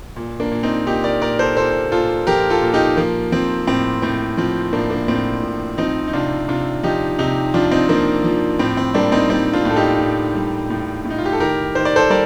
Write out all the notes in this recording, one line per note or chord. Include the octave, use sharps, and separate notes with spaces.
A#2
A#3 D4
A#2
C4 D#4
A#2 D#4 G4
A#4 D5
A#2 A#4 D5
A4 C5
A#2 A4 C5
A#2 F4 A4
F3 G4 A#4
F4 A4
A#2
D#4 G4
F3 A#3
F3 C4
A2 C4
A2 C4
F3 C4
A2 A#3 D4
A#3 D4
A2 C4
A2
F3 C4 D#4
D#4
C3 D4 F4
C3 D4 F4
F3 D#4 G4
C3 D#4 G4
F3 D4 F4
C4 D#4
F3 A#3 D4
F3
A2 C4
C4
G3 A#3 D4
C4 D#4
G3 C4 D#4
D4 F4
A2
A4
D#4 G4
A2
G3
A2
A2
D#4
F4
G4
A4
D#3 G4 A#4
D#3 C5
D5
A4 C5
G3 A#4 D5